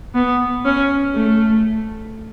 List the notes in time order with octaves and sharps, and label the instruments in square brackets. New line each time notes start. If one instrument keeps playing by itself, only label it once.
[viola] B3
C#4
A3